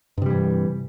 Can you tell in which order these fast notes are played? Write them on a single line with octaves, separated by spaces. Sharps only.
G2 C3 G3 E3